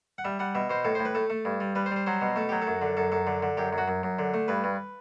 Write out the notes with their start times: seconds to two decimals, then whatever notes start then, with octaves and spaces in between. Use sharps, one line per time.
0.18 F#5
0.25 G3 E5
0.39 G3 F#5
0.55 B2 E5
0.70 B2 C5
0.85 A2 A4
0.95 C5
1.00 A2
1.05 B4
1.15 A3 A4
1.30 A3
1.45 G2
1.60 G3
1.75 G3 B4
1.86 C5
1.91 G3
1.96 C5
2.06 F#3 C5
2.21 B2
2.36 A3 A4
2.49 F#3 G4
2.62 A4
2.67 F#2
2.82 D3
2.97 F#2 A4
3.12 F#2 A4
3.27 D3
3.43 D3
3.57 F#2 G4
3.73 F#2
3.78 F#4
3.88 F#2
4.03 F#2
4.19 D3
4.34 A3
4.48 G2 B4
4.64 G2